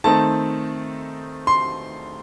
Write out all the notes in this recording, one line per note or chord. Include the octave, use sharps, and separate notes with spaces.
D#3 A3 C4 D#4 A5
C6